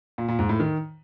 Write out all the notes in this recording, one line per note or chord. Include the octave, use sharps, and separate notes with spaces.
A#2
A#2
G#2
A2
D#3